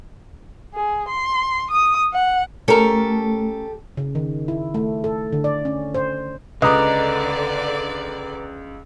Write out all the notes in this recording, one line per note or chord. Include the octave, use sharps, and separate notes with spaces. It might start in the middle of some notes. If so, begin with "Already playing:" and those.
G#4
C6
D#6
F#5
A3 C#4 G4 A4 A#4
C#3
D#3
E4
A3
A4
D3
D5
C#4
C5
C#2 D3 B4 D5 D#5 A#5 D6